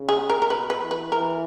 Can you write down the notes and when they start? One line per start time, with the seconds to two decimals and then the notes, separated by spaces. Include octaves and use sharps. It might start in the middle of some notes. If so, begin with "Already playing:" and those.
Already playing: C#3
0.09 G#4
0.30 A#4
0.42 A#4
0.50 B2 B4
0.70 B4
0.81 E3
0.91 B4
1.12 E3 A#4